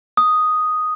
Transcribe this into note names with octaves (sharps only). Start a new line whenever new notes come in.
D#6